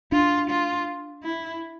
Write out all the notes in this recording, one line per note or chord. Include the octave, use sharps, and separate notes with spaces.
D4 F4
F4
E4